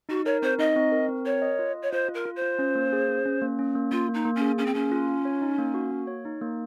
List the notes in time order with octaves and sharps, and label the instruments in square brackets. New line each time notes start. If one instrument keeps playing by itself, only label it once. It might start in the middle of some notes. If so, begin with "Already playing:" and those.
[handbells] D#4 [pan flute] F#4
[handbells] A#4 [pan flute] C#5
[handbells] C4 [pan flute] C5
[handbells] D#4 [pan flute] D#5
[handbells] C4
A#4
C4
[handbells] A#4 [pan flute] C#5
[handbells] D#5
F4
D#5
[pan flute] C#5
[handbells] F4 [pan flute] C5
[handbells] F4
[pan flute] A#4
[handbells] F4
[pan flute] C5
[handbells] F4
C#4
A#3
G#4
C#4
C#4
A#3
C#4
A#3
[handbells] A#3 [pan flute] F4
[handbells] A#3
[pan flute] D#4
[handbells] A#3
[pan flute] C#4
[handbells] G#4
[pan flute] C#4 [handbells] G#4
[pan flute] C4
[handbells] A#3 [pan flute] C#4
[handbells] F4
F4
C#5
D#4
A#3
F#4
A#3
C#5
D#4
A#3